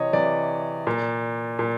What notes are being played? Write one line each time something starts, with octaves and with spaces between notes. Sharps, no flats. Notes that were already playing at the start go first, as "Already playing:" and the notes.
Already playing: C3 E3 C#5 D#5
C3 E3 D5
A#2
A#2